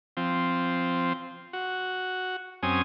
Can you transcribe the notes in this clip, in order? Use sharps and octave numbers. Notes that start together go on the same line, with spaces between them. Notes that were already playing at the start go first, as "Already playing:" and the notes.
F3 C4
F#4
F#2 C4 C#4 G#5 D#6